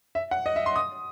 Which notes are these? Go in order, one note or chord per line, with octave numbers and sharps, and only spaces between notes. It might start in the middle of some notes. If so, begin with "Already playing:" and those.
E5
F#5
D#5
E5
C6
D#6